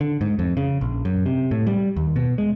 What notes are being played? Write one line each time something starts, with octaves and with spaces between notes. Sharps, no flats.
D3
G#2
F2
C#3
A#1
F#2
C3
A2
G3
D#2
B2
G#3